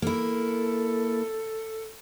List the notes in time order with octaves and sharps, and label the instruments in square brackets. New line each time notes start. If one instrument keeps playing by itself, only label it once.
[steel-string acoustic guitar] A#3 E4 [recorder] A4